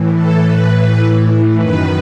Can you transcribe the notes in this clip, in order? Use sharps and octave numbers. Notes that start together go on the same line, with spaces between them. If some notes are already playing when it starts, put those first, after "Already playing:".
Already playing: A2 E3
A4
A2 E3 B4
A2 E3
F#2 D#3 B4